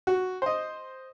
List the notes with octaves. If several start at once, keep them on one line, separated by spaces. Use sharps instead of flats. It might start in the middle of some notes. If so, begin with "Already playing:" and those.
F#4
C5 D#5